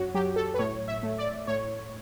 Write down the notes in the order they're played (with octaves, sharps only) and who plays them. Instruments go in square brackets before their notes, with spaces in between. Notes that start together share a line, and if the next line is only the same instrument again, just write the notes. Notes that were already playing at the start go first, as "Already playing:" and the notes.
Already playing: [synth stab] F#2 F#4 C#5
F#3 G4
A4
B4
A2 C#5
E5
A3
D5
A2 C#5